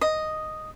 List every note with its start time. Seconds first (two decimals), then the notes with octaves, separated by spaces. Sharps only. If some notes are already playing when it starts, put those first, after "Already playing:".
0.01 D#5